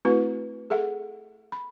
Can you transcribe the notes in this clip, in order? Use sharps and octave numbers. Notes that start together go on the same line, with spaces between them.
A3 C4 E4 F#4 B4
G#4 A4 E5 F#5
B5